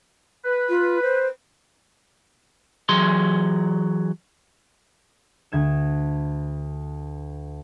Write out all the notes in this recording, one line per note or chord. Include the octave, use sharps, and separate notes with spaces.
B4
F4
C5
E3 F#3 G#4 C6
D2 G#6 E7